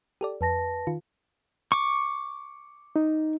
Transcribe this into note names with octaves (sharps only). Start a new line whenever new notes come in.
G4 A4 D5
F2 B4 A5 A#6
D#3 F4
C#6 D6
D#4